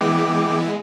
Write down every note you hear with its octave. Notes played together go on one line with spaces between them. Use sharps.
E3 G#3 B3 E4 G5 D6